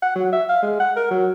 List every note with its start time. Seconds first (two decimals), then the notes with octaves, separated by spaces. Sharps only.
0.02 F#5
0.15 F#3
0.32 E5
0.49 F5
0.62 G#3
0.80 F#5
0.96 A#4
1.10 F#3